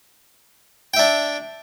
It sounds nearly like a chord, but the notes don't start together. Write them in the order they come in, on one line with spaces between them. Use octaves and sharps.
G5 E5 D4